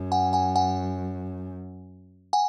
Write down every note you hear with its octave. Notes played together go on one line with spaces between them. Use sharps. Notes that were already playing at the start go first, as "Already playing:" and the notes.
Already playing: F#2
F#5 G#5
F#5 G#5
F#5 G#5
F#5 G#5